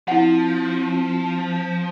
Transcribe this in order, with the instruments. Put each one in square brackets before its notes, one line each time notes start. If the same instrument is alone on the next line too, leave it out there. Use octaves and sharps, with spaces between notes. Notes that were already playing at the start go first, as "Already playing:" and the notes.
[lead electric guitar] F3 [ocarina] C4 [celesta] E4 F#5